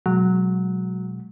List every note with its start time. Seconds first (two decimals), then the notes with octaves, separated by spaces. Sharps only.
0.06 B2 F#3 G#3